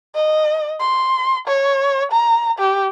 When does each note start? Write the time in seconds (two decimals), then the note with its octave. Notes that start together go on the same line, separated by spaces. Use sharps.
0.15 D#5
0.80 C6
1.47 C#5
2.11 A#5
2.59 G4